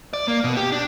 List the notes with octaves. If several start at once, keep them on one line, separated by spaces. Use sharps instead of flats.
D5
A#3
B2
G4
D4